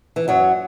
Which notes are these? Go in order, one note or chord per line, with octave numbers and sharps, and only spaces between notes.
E3
F#2 F#3